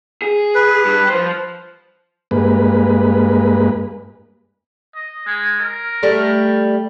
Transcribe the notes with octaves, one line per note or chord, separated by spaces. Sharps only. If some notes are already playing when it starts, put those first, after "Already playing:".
G#4
B4
G2
F3 C5
G2 G#3 A#3 B4
D#5
G#3
A#4
G3 A3